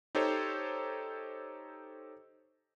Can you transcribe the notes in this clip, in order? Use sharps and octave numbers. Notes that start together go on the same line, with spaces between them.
D#4 G4 A4 C5 C#5